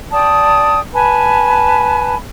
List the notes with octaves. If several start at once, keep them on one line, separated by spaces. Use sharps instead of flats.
D5 G5 A5 D#6
B4 G#5 A5 B5